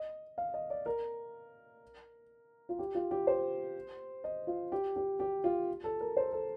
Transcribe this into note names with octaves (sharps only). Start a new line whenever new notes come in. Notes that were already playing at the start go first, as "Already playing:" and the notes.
Already playing: D#5
F5
D#5
D5
A#4
F4
G4
F4
G4
C5
D#5
F4
G4
G4
G4
F4
A4
A#4
C5
A4